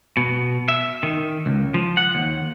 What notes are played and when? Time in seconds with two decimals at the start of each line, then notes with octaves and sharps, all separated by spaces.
0.17 B2
0.68 E5
1.03 D#3
1.46 C#2
1.74 F3
1.97 F#5
2.15 D#2